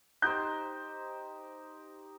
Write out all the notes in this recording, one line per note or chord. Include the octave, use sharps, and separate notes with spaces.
D#4 G4 C5 G6